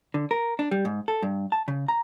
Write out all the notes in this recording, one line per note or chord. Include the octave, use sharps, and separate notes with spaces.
D3
A#4
D4
G3
G#2
A4
G2
A5
C#3
A#5